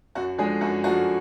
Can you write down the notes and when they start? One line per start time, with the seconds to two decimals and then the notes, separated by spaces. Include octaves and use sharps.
0.15 F#2 F#4
0.38 D3 F3 G#3 G#4
0.61 F#2 F#4
0.84 D3 F3 G#3 F#4